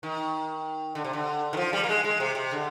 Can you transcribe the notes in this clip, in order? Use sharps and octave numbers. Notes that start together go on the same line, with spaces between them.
D#3
D3
C3
D3
D#3
F3
G3
A#3
G#3
G#3
C3
C3
D3